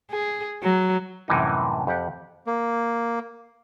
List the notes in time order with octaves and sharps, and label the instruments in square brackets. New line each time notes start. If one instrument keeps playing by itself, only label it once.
[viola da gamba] G#4
F#3
[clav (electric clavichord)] F#2 A2 C3 E3 G3 D#4
F2 G4 F#5
[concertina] A#3